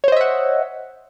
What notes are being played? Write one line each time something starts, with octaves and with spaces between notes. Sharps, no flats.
C5 C#5 D#5 E5 F#5